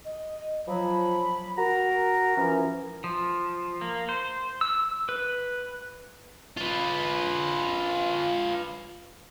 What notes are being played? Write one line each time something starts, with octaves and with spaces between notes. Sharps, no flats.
D#5
F3 F#3 B5
F#4 A#4 A#5
E3 F3 C#4
F3
A#3
C5
E6
B4
F4 B4